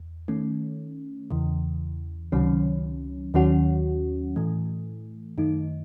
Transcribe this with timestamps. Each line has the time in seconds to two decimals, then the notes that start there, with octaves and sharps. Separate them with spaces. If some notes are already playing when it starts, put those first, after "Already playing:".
Already playing: E2
0.28 D#3 A3 C#4
1.31 E2 C#3 E3
2.32 C#2 C3 D#3 F#3 C#4
3.34 D#2 D#3 F#3 C#4 F#4
4.36 A2 E3 A3
5.38 F#2 D#3 A3 D#4